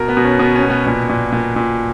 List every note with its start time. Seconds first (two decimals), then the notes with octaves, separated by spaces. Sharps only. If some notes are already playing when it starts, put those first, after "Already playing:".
Already playing: B2 A#4
0.08 B3
0.17 B2
0.24 C#4
0.39 B2 B3
0.56 C#4
0.63 B2
0.70 B3
0.86 A#2 B3
1.09 A#2
1.32 A#2
1.56 A#2